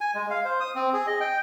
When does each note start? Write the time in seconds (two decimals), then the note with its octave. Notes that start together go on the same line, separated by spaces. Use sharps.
0.01 G#5
0.15 G#3
0.30 F5
0.45 C5
0.60 D#6
0.75 C4
0.94 G#4
1.07 D#5
1.21 G5